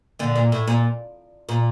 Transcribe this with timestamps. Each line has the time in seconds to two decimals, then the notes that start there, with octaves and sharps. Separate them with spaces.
0.19 A#2 D3
0.36 A#2
0.52 A2
0.67 A#2
1.49 A#2